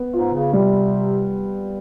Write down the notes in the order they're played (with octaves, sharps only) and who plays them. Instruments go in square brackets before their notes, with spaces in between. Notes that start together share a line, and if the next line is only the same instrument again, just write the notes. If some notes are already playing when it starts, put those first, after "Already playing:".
Already playing: [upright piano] B3
[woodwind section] G#2 [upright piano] F4
[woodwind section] C#3
[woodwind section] C3 [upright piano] G3